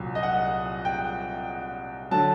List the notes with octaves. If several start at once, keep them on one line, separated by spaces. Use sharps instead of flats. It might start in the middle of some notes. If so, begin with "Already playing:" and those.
Already playing: C2 A#2 F#3
D#5
F#5
G5
D3 F#3 A5